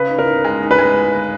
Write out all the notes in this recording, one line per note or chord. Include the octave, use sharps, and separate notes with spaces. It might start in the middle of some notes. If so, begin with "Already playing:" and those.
Already playing: C#3 B4
D#4
A#4
D#4
G#3
D#4
B4
G#3